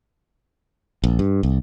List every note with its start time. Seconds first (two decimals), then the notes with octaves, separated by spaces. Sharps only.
1.04 A#1
1.19 G2
1.43 C2